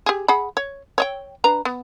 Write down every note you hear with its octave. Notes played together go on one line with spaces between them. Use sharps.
G4 G#4
G#4 F#5 B5
C#5
C#5 D#5 G5
D4 B4 A#5
B3